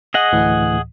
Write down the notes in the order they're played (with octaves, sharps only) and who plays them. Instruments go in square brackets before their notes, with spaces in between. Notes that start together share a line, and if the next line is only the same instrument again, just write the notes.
[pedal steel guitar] G#4 D#5 F#5 [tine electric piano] A#6
[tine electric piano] D2 A2 E3